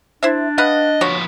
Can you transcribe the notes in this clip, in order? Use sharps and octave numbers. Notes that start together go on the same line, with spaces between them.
D4 E4 C5 E5
B4 D#5 F5 F#5
F3 F#4 B4 C#5